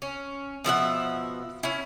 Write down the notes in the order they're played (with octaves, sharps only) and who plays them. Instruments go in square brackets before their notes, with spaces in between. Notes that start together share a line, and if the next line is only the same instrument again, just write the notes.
[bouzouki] C#4
B2 F3 E5 F#5
C#4 E4